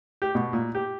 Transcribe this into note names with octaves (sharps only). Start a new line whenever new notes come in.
G4
B2
A#2
G4